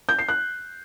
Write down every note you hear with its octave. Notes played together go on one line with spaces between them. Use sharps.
G6
C7
F#6